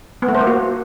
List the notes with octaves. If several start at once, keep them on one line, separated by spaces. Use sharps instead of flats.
B3
A3
C5
A#3
F#4